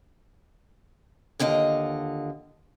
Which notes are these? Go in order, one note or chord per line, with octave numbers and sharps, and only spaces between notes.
D#2 D3 F4 D#5